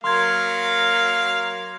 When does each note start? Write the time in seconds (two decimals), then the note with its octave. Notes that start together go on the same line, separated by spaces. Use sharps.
0.04 F#3 A#3 F5 C6 F6 G#6